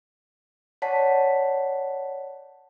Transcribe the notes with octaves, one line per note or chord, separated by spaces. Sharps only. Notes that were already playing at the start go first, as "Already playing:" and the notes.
C#5 D5 F#5 A5 B6